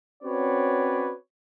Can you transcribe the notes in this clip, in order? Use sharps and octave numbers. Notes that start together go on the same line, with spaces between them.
C4 C#4 F#4 B4 C#5 D5